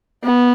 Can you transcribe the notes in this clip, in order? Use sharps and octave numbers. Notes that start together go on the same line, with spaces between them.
B3